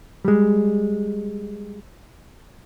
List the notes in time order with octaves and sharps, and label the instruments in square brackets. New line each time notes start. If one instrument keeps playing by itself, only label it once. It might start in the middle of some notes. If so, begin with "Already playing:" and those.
[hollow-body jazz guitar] G3 G#3